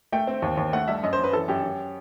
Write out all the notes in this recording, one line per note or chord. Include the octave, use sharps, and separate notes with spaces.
A3 G5
C4
D#2
D#2
A3 F#5
G2 E5
F#2 D#5
C5
F#2
B4
E3 A4
F#2 G4
F#2